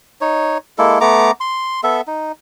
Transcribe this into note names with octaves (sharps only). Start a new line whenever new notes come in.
D#4 C#5
G#3 A#3 E4 A4
A3 B3 A#5 D6
C6
B3 A4 E5
D#4